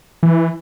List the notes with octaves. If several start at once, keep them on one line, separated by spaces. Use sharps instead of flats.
E3